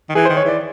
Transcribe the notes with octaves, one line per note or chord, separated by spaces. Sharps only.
D#3
E3 G#4
C5
D#3
C#5
E3 D5